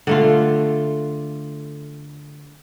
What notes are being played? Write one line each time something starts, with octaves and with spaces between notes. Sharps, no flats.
D3 A3 F4